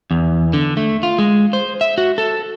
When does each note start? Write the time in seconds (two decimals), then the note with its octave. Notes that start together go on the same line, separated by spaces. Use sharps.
0.11 E2
0.53 D3
0.77 A3
1.03 F4
1.19 G#3
1.53 C5
1.81 E5
1.98 F#4
2.18 A4